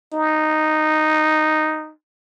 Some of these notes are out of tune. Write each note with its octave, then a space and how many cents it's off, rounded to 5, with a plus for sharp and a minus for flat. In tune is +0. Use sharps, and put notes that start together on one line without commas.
D#4 -5